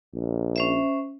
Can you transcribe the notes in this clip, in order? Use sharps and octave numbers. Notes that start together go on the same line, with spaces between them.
A#1
C#4 C5 E5